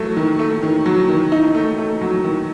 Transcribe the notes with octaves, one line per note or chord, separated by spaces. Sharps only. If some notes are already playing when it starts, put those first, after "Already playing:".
Already playing: F#3 A3
D#3
A3
D#3
F#3
D#3
D#4
A3
A3
F#3
D#3